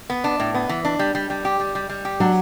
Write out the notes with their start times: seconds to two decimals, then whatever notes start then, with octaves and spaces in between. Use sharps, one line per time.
0.10 B3
0.24 D4
0.40 A2
0.54 B3
0.69 E3
0.85 D4
0.99 G3
1.15 G3
1.30 G3
1.45 G4
1.60 G3
1.75 G3
1.89 G3
2.05 G4
2.20 F#3 D4